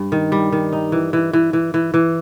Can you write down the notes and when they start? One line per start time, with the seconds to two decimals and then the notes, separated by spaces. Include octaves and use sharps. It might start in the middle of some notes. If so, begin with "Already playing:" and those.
Already playing: G2
0.12 D#3
0.32 G3
0.52 D#3
0.73 D#4
0.92 E3
1.13 E3
1.33 E3
1.53 E3
1.74 E3
1.94 E3